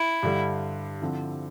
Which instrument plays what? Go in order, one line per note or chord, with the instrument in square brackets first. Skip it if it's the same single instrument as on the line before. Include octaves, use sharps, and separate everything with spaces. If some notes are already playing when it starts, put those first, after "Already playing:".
Already playing: [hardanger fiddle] E4
[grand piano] G2 D3 G3
D3 F3 C4 E4